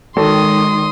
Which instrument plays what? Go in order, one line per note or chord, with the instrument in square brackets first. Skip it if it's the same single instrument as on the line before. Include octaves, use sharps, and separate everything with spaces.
[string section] D#3 [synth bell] G#3 [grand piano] A4 [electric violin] C6 D#6